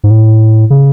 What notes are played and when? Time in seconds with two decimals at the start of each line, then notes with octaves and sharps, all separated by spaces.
0.04 G#2
0.10 A2
0.70 C#3